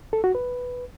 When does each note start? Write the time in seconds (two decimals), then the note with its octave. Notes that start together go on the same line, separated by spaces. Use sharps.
0.13 A4
0.24 F#4
0.35 B4